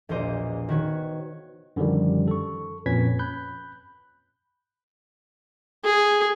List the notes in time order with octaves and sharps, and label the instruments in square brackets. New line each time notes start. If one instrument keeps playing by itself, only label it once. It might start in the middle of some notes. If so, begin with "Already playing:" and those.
[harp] E1 A#1 A#3 C5 D#5
D#3 F#4 B4 C#5
[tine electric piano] F#2 D3 D#3 F3 G3
A4 C#6
F2 A#2 C#4 B4 G#6 B6
B5 F#6 G6
[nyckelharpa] G#4